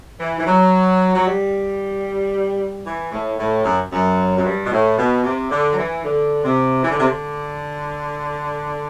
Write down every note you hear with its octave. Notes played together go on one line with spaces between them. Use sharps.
E3
E3
F#3
F#3
G3
E3
A2
A2
F#2
F#2
F#2
G2
B2
A2
B2
C3
D3
F#3
E3
D3
C3
E3
D3
C3
D3